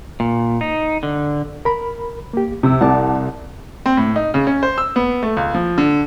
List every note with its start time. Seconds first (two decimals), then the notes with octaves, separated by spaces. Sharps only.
0.20 A#2
0.61 D#4
1.03 D3
1.65 A#4 B5
2.33 A#3 G4
2.63 C2 C3 E6
2.81 C2 F#5 A5 D6
3.86 C4
3.97 A2
4.16 D#4
4.34 C#3
4.47 C#4
4.63 C5
4.78 E6
4.96 B3
5.23 A3
5.37 C#2
5.54 F3
5.78 D3